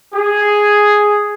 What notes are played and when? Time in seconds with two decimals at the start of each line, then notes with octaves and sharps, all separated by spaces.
0.13 G#4